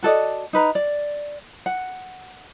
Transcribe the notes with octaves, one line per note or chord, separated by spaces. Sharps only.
F#4 A4 D5 D#5
D#4 B4 A#5
D5
F#5